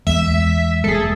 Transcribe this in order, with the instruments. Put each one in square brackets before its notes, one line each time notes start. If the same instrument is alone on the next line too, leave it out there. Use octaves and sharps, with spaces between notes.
[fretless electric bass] E2 E3 G#3 [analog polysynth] E5
[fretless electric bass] E1 G#3 [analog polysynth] G#4 A4